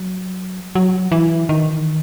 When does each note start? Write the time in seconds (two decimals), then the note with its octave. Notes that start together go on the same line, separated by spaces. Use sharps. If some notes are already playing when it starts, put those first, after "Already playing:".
Already playing: F#3
0.75 F#3
1.12 E3
1.49 D#3